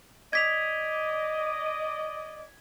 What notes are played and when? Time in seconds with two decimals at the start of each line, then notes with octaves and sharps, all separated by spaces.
0.33 D5 D#5 G#6 B6 F7